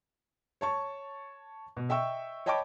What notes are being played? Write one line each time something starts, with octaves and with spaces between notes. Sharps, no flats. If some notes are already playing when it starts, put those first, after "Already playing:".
C#5 A5 C#6
B2
D#5 E5 G5 C#6 E6
C#5 D#5 G5 A5 B5 D6